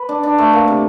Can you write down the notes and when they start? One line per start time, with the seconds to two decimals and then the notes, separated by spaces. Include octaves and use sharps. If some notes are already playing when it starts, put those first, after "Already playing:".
Already playing: B4
0.09 D4
0.23 D4
0.38 A3
0.53 A#3
0.68 C3